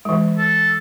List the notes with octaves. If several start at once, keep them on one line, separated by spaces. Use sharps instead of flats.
E3 G#3
A4